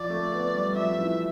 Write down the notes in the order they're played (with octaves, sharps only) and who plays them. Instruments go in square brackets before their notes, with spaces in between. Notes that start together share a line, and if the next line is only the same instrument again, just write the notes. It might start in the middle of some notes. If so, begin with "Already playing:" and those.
Already playing: [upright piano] F3 [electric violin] D5
[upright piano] A3
B3
G3
[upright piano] F3 [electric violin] E5
[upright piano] F3
E3